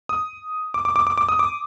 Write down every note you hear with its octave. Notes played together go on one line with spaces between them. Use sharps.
D#6
D6
D6
D6
D6
D6
D#6
D6